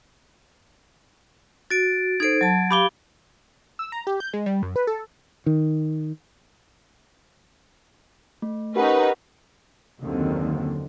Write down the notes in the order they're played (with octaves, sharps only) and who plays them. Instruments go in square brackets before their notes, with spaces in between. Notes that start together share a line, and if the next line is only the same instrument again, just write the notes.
[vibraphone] F#4 [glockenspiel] A6 D7
[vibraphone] D#4 A4 C5 [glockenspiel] G#6 D7
[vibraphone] F#3 A5
[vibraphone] G4 F5 [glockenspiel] B5 D6 G7
[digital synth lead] E6
A#5
G4
G6
G#3
G3
F#2
B4
A4
[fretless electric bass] D#3
[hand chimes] A3
[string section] C#4 D#4 B4 [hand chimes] G4 A#4 F#5
[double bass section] F#1 D#2 D3 D#3 C4